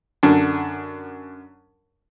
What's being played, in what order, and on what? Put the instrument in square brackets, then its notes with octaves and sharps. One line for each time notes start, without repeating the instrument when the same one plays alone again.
[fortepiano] F#2 D3 D4